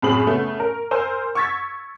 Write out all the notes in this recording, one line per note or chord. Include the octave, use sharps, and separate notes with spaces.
F#2 A2 C4 G#4 B5 F#7
C#3 A3 B3
A#4
A#4 C5 G#5 C6 E6 F6
C#6 E6 G#6 A6 B6